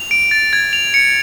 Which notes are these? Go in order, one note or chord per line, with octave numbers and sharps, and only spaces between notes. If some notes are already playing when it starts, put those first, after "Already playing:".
Already playing: F7
D7
A6
G#6
F7
C#7